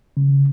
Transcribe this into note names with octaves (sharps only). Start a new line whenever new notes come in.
C#3